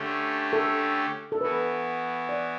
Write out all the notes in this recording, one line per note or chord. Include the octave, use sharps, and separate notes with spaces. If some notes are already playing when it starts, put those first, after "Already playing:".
Already playing: D3 A3 C#4 G4
A4
A4
E3 B3 F#4 B4
D5